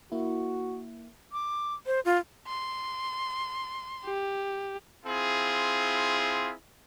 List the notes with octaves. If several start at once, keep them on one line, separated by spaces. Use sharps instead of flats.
A#3 E4 F#4
D6
C5
F4
C6
G4
C4 E4 F4 G#4